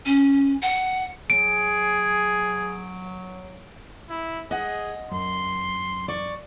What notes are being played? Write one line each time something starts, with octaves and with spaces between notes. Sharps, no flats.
C#4
F#5
F#3 G#4 D7
E4
G#4 D#5 F#5
F#2 C6
D5 C#6